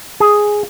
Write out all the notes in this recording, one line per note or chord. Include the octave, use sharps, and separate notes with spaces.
G#4